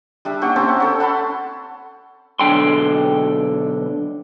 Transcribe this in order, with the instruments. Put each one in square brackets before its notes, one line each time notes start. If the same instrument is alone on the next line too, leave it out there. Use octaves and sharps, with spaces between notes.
[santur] G3 D4 E5
A#3 C#4 G4 F#5
C4 C#4 A5 A#5
F#5
C#4 A4 G5
F#5 A5 B5 C6
[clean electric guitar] B1 D3 G5 C6